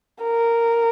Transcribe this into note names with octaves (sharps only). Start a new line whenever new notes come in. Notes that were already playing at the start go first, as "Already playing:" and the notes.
A#4